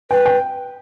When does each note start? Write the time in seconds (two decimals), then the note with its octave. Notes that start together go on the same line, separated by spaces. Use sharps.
0.11 B4 G5
0.26 G5